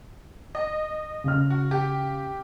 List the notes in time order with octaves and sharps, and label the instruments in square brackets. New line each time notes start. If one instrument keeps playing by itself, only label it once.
[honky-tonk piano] D#5
[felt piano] C#3 F6
[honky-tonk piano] F#4
G4